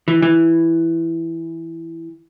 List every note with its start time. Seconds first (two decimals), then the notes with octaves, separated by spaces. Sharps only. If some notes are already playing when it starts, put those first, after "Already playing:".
0.08 E3
0.22 E3